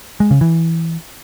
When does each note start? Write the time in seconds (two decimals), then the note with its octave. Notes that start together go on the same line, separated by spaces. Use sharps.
0.20 G#3
0.31 C#3
0.41 E3